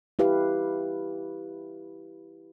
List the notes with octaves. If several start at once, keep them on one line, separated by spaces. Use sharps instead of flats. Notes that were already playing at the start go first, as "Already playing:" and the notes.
E4 G4 B4 F5